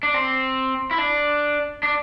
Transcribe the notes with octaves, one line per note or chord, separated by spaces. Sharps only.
D4
C4
E4
D4
D4